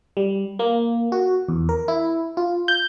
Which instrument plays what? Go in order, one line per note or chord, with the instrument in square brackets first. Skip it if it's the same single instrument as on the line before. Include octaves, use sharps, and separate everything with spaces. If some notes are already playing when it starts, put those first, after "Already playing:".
[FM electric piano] G3
A#3
F#4
E2
A#4
E4
F4
G6